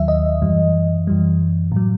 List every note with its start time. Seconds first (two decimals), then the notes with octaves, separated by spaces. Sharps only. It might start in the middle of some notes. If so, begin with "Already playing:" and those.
Already playing: D#2 D#3 F#3 E5
0.08 D#5
0.42 F#2 E3 G3
1.07 F#2 E3 G3
1.72 A2 F#3